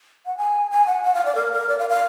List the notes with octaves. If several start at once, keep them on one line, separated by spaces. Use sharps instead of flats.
F#5
G#5
G#5
F#5
F#5
F5
D5
A#4
A#4
D5
F5
F5